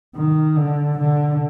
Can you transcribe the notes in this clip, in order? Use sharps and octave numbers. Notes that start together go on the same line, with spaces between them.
D#3
D3
D3